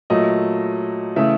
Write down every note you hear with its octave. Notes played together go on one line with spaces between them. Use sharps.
A#2 F#3 A3 D#5
C#3 E3 A3 E5